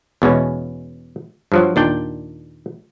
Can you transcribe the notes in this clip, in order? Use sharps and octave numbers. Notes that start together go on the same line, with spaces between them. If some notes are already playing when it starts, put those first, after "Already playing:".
E2 B2 G#3 C#4
G2 F3 F#3
D#2 A#2 D4 D5 G5